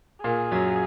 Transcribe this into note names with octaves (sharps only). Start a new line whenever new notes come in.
A#2 A#3 G#4
F#2 F#3